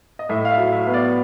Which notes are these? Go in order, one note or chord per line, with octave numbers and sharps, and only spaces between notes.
D#5
A2 E5
F5
E5
F#3
E5
B3
D5